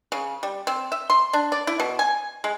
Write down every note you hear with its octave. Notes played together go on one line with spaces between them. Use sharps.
C#3
G3
C4
E5
C6
D4
D5
E4
B2
G#5
G#3